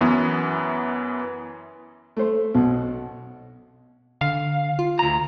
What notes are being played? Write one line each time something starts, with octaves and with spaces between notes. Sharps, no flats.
F#2 E3 B3
A3 C5
B1 B2
D3 F5
F4
D2 A#5